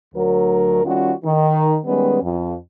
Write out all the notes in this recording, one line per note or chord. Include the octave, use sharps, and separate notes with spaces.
D2 F#3 A#4
D#3 G3 C#4 F4 F#4
D#3
D#3 G3 G#3 B3 C#4 B4
F2